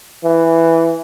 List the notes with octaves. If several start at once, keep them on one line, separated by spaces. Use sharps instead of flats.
E3